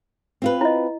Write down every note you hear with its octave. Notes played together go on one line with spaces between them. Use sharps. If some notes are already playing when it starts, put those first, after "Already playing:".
C4 F4 B4
E4 D#5